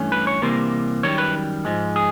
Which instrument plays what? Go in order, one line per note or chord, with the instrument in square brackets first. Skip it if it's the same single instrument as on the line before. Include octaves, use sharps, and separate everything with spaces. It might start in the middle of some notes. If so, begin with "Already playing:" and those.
Already playing: [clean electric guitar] G2 E3 A3 C#4
B4
C#5
C3 E3 G3 A#3 C5
F#2 D#3 G3 C#5
B4
G#2 F3 G#3
G#4